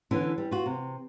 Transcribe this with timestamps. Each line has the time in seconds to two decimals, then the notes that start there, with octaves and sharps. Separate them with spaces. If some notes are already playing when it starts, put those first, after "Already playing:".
0.11 D3 E3 C#4 E4
0.38 G3
0.51 F4 F#4
0.66 C3